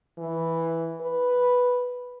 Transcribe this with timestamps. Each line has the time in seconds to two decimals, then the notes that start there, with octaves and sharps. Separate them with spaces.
0.18 E3
1.01 B4